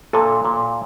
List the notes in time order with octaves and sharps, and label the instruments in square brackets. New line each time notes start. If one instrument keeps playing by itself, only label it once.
[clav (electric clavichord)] A#2 [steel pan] A4
[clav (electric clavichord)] A#2